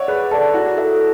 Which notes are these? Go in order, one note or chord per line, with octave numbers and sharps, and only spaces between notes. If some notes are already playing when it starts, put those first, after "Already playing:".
Already playing: C#5 D5 E5 F#5
G#4 B4
A4 D5 A5
E4 F#4
A4 E5